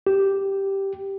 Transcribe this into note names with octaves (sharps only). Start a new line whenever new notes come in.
G4